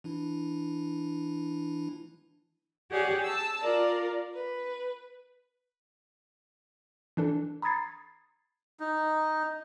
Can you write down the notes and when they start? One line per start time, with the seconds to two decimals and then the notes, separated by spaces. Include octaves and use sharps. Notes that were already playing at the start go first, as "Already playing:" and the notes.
0.04 E3 D4 E4
2.90 G4 G#4 C#5 D5 F#5
3.23 A5 E6
3.61 F4 A#4 D5
4.34 B4
7.17 E3 D4 A4
7.62 A#5 B5 D#6 G#6 A6 C7
8.80 D#4